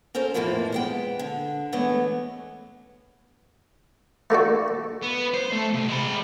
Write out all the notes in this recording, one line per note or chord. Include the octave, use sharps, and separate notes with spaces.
C#4 A4 A#4 C5
F2 A2 E3 F3 A#3 E4
G#3 B3 G5
D3
E3 G#3 A3 B3 C#4
A3 A#3 D4 F#4
B3
C5
A3
C2
G#3 B5